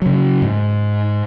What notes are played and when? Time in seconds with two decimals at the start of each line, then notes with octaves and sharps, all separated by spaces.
0.02 C#3 F#3
0.42 G#2